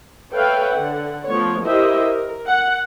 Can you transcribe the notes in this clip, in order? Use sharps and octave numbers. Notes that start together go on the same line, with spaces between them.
A4 B4 C#5 E5 F5 G5
D3 F#5
F3 A3 B3 C#5
E4 G4 A#4 C5 D#5 E5
A#4
F#5